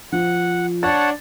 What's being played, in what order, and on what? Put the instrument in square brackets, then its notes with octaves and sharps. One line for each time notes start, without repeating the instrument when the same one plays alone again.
[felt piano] F3 [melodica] F#5
[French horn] D4 [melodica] C#5 F#5 A5 [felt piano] A6